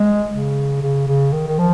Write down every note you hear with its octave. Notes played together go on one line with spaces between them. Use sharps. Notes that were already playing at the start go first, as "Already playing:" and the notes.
Already playing: G#3
C#3
C#3
C#3
D#3
D#3
F3